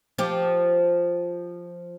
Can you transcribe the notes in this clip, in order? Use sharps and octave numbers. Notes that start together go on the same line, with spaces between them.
F3 G4